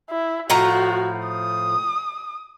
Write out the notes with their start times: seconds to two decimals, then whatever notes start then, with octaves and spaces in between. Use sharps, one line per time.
0.10 E4
0.50 A2 F3 F#4 A#5
1.28 D#6